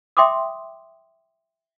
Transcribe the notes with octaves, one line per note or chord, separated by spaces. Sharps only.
E5 G5 C6 D6 D#6